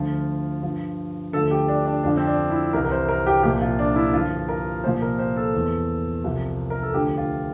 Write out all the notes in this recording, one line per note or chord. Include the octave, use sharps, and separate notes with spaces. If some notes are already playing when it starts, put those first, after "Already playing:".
Already playing: D2 D3 F3 F4
G2 F3
D2 D3 F3 A4
G4
D4
D4
F2 D3 F3 D4
C4
D4
E4
C2 C3 E3 A#4
A#4
C5
A#4
G4
C2 A#2 F3 G4
F4
D4
E4
G2 D3 F3 F4
A#4
C2 A#2 F3 C5
A#4
C5
A4
E2 E3
C2 C3 F3
A#4
A4
D2 D3 F3 G4
F4